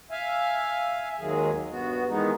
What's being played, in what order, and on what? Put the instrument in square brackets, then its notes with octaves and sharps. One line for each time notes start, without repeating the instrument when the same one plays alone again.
[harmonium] E5 F5 G#5
D#2 D#3 F#3 G#3 G#4
G2 B3 F#4
D#3 E3 G#3 B3 D#4